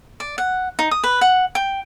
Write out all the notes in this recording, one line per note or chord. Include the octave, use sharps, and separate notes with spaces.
D5
F#5
D#4
D#6
B4
F#5
G5